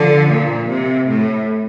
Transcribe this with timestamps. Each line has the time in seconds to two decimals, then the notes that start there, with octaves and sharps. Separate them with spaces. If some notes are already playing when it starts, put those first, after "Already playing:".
Already playing: D3 F3
0.30 A#2
0.69 C3
1.08 A2